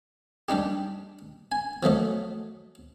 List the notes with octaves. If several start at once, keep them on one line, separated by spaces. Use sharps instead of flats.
G3 D4 D#4 G4
G#5
F3 F#3 A3 D#5